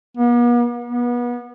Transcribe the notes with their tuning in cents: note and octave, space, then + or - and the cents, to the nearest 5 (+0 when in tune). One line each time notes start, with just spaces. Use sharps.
B3 -45
B3 -30